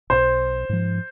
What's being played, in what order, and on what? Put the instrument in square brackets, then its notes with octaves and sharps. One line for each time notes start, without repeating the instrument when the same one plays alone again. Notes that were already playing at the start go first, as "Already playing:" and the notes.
[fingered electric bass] B1 [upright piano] C5
[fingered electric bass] G#2 F3